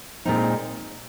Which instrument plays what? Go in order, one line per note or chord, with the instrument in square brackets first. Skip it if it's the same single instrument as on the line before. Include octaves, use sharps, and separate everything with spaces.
[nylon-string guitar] A#2 G#3 C4 D#4